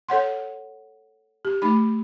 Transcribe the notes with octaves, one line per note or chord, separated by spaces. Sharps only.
A4 C#5 F#5 C6
G4
A3 D#4 B5